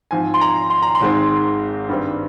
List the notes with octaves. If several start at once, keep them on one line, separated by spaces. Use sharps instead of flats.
G#2 F3 C4 G#5
C6
A#5
C6
A#5
C6
G#1 G#2 D#3 G#3 C4
G2 D#3 G3 C4